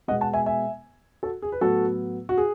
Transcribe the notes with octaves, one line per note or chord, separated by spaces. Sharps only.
B2 G#3 B3 D#5 F#5
F#5 A5
E5 G#5
E5 G#5
F#4 A4
G#4
B4
A2 F#3 B3 F#4 A4
F#4
G#4